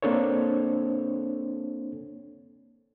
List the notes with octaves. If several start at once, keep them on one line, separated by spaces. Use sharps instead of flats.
A#3 C4 D4 A4 C5 C#5